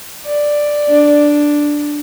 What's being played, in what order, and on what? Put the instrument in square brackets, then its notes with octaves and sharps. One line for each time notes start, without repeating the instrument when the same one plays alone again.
[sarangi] D5
[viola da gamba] D4